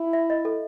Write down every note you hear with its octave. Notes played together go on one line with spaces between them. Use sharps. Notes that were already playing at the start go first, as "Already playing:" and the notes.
Already playing: E4
E5
D#5
A4